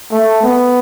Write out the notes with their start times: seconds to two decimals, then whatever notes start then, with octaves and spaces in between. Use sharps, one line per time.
0.12 A3
0.43 B3